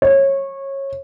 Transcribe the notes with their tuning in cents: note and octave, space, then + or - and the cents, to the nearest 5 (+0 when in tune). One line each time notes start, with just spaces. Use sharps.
C#5 -20